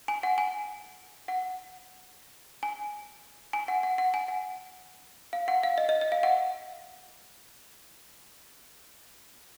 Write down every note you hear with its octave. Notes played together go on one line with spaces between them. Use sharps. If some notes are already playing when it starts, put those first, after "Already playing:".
G#5
F#5
G#5
F#5
G#5
G#5
F#5
F#5
F#5
G#5
F#5
F5
F#5
F5
D#5
D#5
D#5
F5
F#5